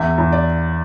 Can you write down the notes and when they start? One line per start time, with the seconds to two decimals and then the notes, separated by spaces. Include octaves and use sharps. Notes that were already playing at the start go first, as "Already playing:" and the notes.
Already playing: E2 E5
0.18 E2
0.32 D5